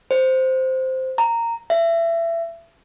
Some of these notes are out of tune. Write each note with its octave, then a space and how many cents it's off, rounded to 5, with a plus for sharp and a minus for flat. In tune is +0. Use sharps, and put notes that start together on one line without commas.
C5 -5
A#5 -10
E5 +25